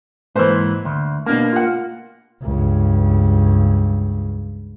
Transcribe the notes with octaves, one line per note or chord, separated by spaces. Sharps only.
G#2 E3 A#3 B4 C5
D2
B2 A#3 D4
F4 F#5
C#2 G2